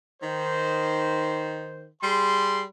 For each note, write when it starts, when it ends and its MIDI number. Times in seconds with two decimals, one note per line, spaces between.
0.21 1.87 51
0.21 1.87 72
2.02 2.63 55
2.02 2.63 68
2.02 2.63 84